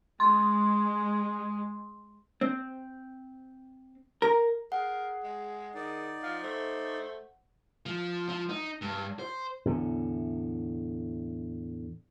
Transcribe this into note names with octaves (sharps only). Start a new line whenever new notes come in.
G#3 C6
C4
A#4
G#4 A#4 F#5
G#3
D#3 D#4 D5
F3 F5
A3 C5
F3
F3
D#4
G2
C5
E2 A2 D3